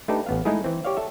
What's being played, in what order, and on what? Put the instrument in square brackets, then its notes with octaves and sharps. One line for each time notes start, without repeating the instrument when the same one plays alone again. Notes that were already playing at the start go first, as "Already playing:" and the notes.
[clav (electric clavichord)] A3 D4 D#4 G4 B4 A5
A1 B3 F5
G#3 A3 D#4 E4 G#4
E3 C4
G4 C#5 D5 F5
A4 E5